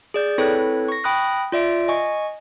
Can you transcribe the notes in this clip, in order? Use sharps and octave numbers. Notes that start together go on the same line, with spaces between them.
G#4 D5 G6
C4 E4 A4 B4 C#5
C#6 A#6
G5 B5 D#6 F#6 A#6
F4 D5 E5 D7
D#5 G#5 C#6